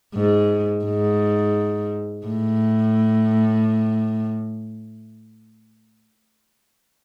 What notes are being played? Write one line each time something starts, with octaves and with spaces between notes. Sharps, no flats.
G#2
G#2
A2